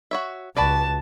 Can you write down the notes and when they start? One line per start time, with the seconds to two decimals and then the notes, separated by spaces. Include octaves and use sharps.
0.11 F#4 C#5 E5
0.57 C#2 F#4 B4 D5 A5